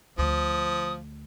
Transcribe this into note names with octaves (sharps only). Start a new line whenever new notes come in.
D2 F3 D#6